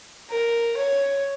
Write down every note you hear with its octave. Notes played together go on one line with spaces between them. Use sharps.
A#4
C#5